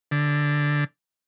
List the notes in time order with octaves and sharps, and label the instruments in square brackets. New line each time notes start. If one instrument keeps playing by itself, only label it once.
[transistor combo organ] D3